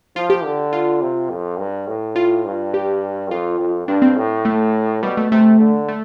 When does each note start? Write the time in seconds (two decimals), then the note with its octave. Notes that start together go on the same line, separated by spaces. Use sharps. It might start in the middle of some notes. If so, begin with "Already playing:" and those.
0.16 F3 F4
0.30 G4
0.44 D3
0.73 F4
1.02 C3
1.30 F2
1.59 G2
1.88 A2
2.16 F4
2.45 G2
2.74 G4
3.31 F2 F4
3.60 F2
3.88 G2 D4
4.02 C4
4.16 A2
4.45 A3
5.03 B2 G3
5.17 A3
5.32 C3 A3
5.60 D3
5.88 A3